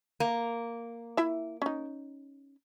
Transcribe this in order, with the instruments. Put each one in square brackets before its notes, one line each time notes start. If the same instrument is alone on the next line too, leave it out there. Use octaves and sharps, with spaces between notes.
[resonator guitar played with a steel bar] A#3
[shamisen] E4 E5
C#4 D#4